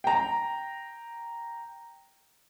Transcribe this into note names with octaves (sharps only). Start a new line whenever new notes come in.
G5 A#5